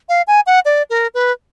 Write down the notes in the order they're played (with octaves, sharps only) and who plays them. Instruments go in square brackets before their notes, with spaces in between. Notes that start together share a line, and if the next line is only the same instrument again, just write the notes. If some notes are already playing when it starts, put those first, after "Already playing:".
[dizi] F5
G#5
F#5
D5
A#4
B4